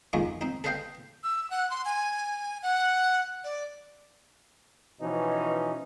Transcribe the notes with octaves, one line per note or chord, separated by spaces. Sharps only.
B1 F#2 D#3 F3 G#3 A#3
C4 D#4
A4 B4 C5 D#5 F5 G5
E6
F#5
C6
G#5
F#5
D5
B2 E3 F3 C#4 D#4